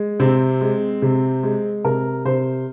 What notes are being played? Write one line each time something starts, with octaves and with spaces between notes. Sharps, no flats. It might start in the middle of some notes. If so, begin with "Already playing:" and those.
Already playing: G#3
C3 C4
G#3
C3
G#3
C3 A#4
C3 C5